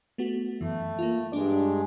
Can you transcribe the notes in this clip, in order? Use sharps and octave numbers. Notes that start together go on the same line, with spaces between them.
A3 B3 F#4
F#2 E3 A3
A#3 F4
G2 G#3 D4 D5